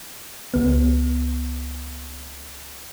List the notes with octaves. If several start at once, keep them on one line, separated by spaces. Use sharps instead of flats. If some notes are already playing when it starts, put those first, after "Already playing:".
C#2 B3